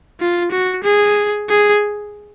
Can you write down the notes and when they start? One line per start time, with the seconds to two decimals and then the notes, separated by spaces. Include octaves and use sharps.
0.20 F4
0.51 F#4
0.84 G#4
1.49 G#4